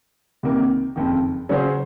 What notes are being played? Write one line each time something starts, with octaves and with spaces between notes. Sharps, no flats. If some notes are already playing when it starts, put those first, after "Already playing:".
C2 C3 D#3 A#3
F#1 F2 D#3
C#3 F#3 C#4 G#4 C5